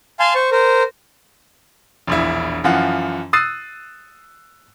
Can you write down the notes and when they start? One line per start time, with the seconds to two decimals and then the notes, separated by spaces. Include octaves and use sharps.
0.20 F5 G#5 A5 C6
0.35 C5 C#6
0.52 A#4 C5
2.07 E1 A#1 E4
2.64 F#2 E3 F3 F4 F#5
3.33 D#6 E6 F#6 A6 C7 D#7